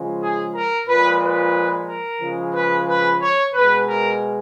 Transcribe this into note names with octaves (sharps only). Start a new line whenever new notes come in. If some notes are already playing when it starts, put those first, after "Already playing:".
Already playing: C#3 F3 G#3
G#4
A#4
A#2 F3 G#3 B4
B4
A#4
C#3 F3 G#3
B4
B4
C#5
B2 G#3 B4
A#4